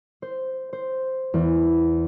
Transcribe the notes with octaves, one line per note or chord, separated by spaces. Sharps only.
C5
C5
E2